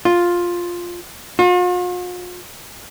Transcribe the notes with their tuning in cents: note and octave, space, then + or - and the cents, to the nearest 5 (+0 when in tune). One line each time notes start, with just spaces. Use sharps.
F4 +5
F4 +45